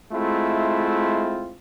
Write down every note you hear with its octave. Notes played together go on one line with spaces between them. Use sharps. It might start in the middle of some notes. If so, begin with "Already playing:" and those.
G#3 A3 C4 E4 F4